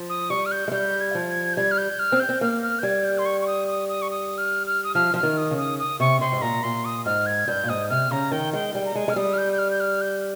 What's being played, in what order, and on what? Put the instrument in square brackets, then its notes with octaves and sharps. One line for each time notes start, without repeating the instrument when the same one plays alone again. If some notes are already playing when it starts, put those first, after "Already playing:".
Already playing: [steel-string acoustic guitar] F3
[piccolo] D#6
[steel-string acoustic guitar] G3 [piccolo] C#6
[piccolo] F6
G6
[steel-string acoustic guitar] G#3
[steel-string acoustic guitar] G3 [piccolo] G6
[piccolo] G#6
[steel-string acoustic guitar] F3
[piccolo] G#6
G6
[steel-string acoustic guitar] G3 [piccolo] G#6
[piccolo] F6
G6
F6
[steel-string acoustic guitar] C4
[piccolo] G6
[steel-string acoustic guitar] C4
[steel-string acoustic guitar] A#3 [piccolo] F6
[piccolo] F6
G6
[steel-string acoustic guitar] G3 [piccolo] G#6
[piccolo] G6
C6
C#6
C#6
D#6
D#6
D#6
C#6
D#6
F6
F6
D#6
[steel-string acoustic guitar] F3 [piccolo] F6
[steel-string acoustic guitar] F3 [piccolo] F6
[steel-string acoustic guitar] D#3
[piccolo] D#6
[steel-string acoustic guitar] C#3
[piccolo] D#6
D#6
[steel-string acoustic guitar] C3 [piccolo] C#6
[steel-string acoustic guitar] C3 [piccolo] C6
[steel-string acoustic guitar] G#2
[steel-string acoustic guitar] A#2 [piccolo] A#5
[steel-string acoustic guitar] A#2 [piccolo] C6
[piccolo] D#6
[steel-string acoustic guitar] G#2 [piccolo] F6
[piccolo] G#6
[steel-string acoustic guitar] G2 [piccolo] G6
[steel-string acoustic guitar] A#2
[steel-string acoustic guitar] G#2 [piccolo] D#6
[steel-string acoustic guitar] C3 [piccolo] F6
[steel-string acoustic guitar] C#3 [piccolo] A#5
[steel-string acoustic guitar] D#3 [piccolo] G5
[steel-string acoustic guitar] G#3 [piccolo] G5
[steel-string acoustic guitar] G3 [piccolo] G5
[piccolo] A#5
[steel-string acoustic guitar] G#3 [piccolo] G#5
[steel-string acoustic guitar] G#3 [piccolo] F6
[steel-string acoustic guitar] G3 [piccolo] D#6
[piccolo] F6
G6
G6
F6
G6
F6
G6